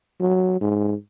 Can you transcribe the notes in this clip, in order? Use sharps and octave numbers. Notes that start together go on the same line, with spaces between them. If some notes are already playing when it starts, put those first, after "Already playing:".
F#3
G#2